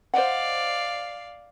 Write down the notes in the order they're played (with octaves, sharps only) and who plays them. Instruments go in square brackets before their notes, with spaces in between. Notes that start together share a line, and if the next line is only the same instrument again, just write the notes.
[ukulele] C5 D#5 F#5 [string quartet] D5 F5